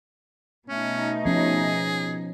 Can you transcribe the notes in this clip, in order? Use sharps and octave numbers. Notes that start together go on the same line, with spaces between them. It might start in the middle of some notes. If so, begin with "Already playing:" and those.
B2 A3 C#4 D#4
F3 C#4 G#4